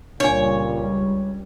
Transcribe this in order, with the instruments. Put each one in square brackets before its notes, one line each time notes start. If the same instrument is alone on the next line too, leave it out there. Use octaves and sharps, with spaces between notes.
[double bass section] C#2 G3 [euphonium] A#2 [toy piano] D4 G#5 [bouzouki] C#5